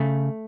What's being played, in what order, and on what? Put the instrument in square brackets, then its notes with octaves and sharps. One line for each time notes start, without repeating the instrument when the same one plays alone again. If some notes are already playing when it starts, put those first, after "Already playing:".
Already playing: [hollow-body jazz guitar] C#3 A3